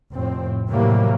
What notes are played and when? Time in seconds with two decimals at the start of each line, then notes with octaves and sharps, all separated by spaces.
0.13 F1 A2 C4
0.69 A2 C3 E3 F#3 G3 A#3